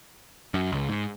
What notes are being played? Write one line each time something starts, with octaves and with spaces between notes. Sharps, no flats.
F#2
C#2
G#2